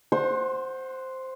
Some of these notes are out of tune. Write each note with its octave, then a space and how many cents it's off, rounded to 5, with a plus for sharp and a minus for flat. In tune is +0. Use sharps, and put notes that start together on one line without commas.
C5 +0 F#5 +0 C6 +40